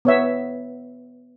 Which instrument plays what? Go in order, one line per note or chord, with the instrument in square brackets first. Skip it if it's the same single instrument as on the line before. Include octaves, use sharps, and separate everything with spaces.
[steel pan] B3 C#5 E5